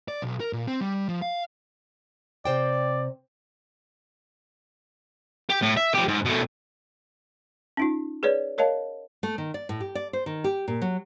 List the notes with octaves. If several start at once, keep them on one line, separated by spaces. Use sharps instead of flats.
D5
B1
A#4
A#2
C4
G3
F3
F5
C3 C5 D5 G5
G4
A2
E5
F3 G4
G#2
B2 A3
C#4 D#4 F4
G#4 B4 C#5 D5
A#4 C#5 D#5 F5 A5
A3
D#3
D5
A2
G4
D5
C5
D#3
G4
A#2
F#3